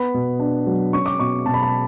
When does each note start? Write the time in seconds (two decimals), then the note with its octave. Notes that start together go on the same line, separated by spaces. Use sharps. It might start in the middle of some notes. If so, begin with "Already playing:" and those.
Already playing: B3 B5
0.14 B2
0.40 D4
0.67 F#3
0.93 C#4 C#6
1.06 D6
1.20 B2 C#6
1.46 B2 A5
1.54 B5
1.62 A5